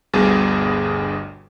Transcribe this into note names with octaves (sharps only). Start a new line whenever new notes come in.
G1 D2 G2 B2 G#4 A6